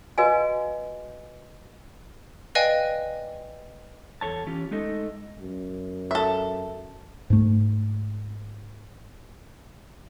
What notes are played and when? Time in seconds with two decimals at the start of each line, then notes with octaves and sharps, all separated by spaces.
0.18 F#4 B4 D#5 F5 G#5
2.55 B4 D5 D#5 F5 G5 G#5
4.21 E2 A4 C#5 A5
4.46 E3 C#4 F4 G4
4.71 G#3 A3 D#4 A4 D#5
5.39 F#2
6.11 A4 E5
7.30 G#2 A3